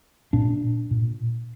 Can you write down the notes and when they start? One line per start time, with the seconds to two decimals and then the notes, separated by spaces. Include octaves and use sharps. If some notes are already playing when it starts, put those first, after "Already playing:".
0.33 A#2 D4
0.91 A#2